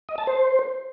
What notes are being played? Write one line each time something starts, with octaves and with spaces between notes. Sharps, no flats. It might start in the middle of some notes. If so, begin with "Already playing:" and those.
D#5
A5
C5